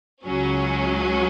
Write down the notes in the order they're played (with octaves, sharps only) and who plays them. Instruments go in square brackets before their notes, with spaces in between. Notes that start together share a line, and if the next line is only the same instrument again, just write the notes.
[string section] C#2 C#3 F#3 C#4